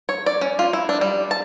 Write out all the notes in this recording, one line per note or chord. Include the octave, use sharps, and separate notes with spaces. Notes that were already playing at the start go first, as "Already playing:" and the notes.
C#5
D5
C#4
F4
E4
D4
G3
A5